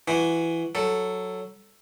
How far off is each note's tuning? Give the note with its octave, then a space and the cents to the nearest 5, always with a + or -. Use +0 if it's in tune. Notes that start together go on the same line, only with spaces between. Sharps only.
E3 +15 F#4 +0
F#3 +0 A4 +0